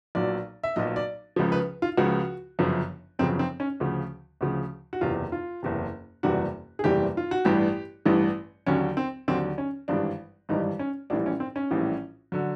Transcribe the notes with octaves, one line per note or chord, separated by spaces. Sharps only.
B1 A#2 F#3 D5
E5
B1 A#2 F#3 D#5
D5
C#2 C#3 F3
B4
F4
C#2 C#3 F3 F#4
G1 F#2 C#3 F3
G1 F#2 C#3 F3 C4
C4
C#4
D2 C#3 F3
D2 C#3 F3
F#4
F#1 E2 C3 F4
F4
F#1 E2 C3
F#1 E2 C3 E3 G3 F#4
G#4
F#1 E2 C3 E3 G3 G4
F4
F#4
A1 G2 E3 G3 G4
A1 G2 E3 G3
D#2 D3 F#3 C#4
C4
D#2 D3 F#3 C4
C#4
G#1 G2 E3 G3 D4
G#1 G2 E3 G3 D#4
C#4
A#1 A2 E3 G3 D4
C#4
C4
C#4
A#1 A2 E3 G3
D3 F#3